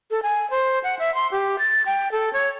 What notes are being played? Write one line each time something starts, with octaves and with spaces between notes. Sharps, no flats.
A4
G#5
C5
F#5
E5
C6
G4
A6
G5
A4
C#5